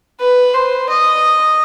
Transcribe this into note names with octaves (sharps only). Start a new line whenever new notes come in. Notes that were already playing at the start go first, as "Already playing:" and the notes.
B4
C5
D#5